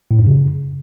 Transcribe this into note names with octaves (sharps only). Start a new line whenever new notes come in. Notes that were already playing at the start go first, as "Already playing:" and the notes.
A2
F#2
C#3